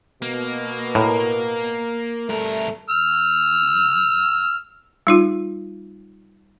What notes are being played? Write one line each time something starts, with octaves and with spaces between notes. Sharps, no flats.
B2 A#3
A2 A#4
G2 A3 A#4
E6 F6
G3 D#4 F4